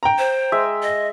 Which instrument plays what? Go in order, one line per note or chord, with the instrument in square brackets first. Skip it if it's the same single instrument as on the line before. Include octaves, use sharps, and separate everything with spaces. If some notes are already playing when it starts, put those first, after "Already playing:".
[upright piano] G5 A#5
[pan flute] C5
[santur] G#3 E5
[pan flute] D#5